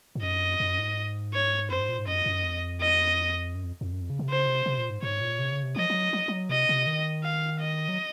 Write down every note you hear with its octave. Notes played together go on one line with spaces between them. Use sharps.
G#2
F#2 D#5
F#2
G#2
C#5
F#2 C5
G#2
A#2
G#2
F#2 D#5
F#2
F2
D#5
F#2
F2
F2
F#2
F2
C#3
C3
C#3 C5
C3
C3
A#2
G#2
G#2 C#5
A#2
C3
C#3
C3
F3 D#5
F3
F#3
F#3
F#3
C3 D#5
C3
D#3
F5
D#5
F#3